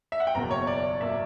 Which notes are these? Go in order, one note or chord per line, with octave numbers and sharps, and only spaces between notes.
E5
F#5
G5
F#1 E2 B2 A#3 A#5
C#5
D5
B2 A#3 E5